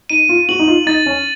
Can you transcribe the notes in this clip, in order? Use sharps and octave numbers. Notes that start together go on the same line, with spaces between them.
D#4 D#7
F4
F#4 F#7
D#4
F4
D#4 A6
C#4